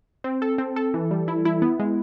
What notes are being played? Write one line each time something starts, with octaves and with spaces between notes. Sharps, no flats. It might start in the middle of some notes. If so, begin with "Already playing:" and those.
C4
A4
C4
A4
E3
G3
E4
E4
B3
G#3